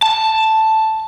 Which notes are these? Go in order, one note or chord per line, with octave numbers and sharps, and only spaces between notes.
A5